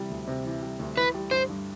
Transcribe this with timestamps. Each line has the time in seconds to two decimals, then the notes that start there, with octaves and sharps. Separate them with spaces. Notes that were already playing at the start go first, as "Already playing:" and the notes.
Already playing: C3 E3 G3
0.10 D2
0.28 C3
0.45 E3
0.62 G3
0.79 D2
0.97 E3 B4
1.14 G3
1.31 G2 C5
1.49 G2